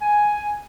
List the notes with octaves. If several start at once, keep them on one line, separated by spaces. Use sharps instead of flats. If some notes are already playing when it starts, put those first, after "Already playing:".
G#5